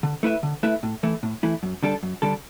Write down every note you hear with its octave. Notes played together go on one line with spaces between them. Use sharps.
D3
A3 E4 B4 E5
D3
A3 E4 B4 E5
A2
E3 A3 E4
A2
E3 A3 E4
F#2
D3 G3 D4 A4
F#2
D3 G3 D4 A4